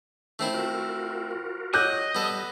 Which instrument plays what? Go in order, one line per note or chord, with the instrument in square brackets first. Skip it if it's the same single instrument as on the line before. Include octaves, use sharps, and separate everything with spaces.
[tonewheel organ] D#3 C#4 [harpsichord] A3 C4 E4
[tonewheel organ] F4 F#4 A#4
[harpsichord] F#3 [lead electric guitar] D#5 [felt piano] D6 F#6 G6
[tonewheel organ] G3 [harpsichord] B3 A4